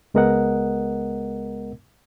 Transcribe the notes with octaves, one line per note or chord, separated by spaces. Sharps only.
C#2 G#3 B3 A#4 D#5 F#5